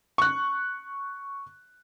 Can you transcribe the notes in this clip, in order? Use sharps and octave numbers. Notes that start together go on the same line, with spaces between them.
C#6 F#6